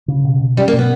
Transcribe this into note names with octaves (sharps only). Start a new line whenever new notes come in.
C#3
B2
B2
G3 C#4
A#3
B2
B3